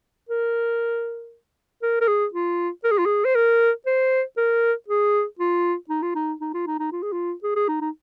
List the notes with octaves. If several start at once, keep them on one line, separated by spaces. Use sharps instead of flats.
A#4
A#4
A#4
G#4
F4
A#4
G#4
F4
G#4
C5
A#4
C5
A#4
G#4
F4
D#4
F4
D#4
D#4
F4
D#4
D#4
F4
G#4
F4
G#4
G#4
D#4
D#4